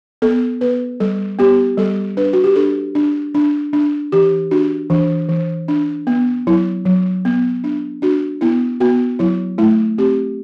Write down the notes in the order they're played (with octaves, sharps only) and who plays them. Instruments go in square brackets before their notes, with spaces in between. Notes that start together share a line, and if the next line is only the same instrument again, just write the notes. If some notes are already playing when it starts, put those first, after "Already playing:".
[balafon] B3 A4
B3 B4
G3 A4
B3 G4
G3 A4
D4 B4
F#4
G4
D4 A4
D4
D4
D4
E3 G4
D4 F#4
E3 D4
E3
D4
B3
F#3 E4
F#3
B3
D4
D4 F#4
B3 E4
B3 F#4
F#3 E4
A3 E4
C4 G4